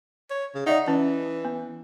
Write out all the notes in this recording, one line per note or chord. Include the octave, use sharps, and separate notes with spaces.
C#5
C#3
D#4 D5 E5 F#5
E3 C#4
B3